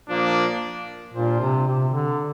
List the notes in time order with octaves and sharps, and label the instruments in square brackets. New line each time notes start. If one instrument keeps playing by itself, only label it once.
[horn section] A#2 F3 A#3 D4
[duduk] A#2 [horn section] G3 D4 F4 C5
[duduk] C3
C3
D3